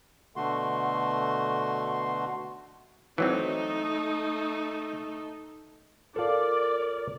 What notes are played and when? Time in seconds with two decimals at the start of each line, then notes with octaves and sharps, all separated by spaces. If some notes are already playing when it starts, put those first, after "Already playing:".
0.36 B2 D3 A3 F#4 C6
3.18 E3 F#3 A3 C4 D#4
6.16 F4 A4 A#4 D5